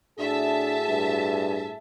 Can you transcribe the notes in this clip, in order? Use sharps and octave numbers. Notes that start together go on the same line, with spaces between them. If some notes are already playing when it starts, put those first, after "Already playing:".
A2 D4 F#4 G#4 E5 A5
G2